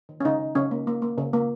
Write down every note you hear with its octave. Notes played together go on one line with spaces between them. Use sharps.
D#3
C#4
C#3 D#4
C#3
C#3 C#4
A#3
A#3
A#3
C#3
A#3